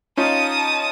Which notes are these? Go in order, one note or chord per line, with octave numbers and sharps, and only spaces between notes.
C#4 D#4 F4 A5 D#6